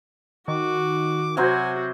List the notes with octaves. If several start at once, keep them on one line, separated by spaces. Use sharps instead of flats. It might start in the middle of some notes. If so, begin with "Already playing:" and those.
D#3 F#4 D6
C3 F#3 F#4 C5 G#5